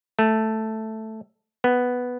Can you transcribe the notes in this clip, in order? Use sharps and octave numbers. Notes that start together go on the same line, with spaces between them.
A3
B3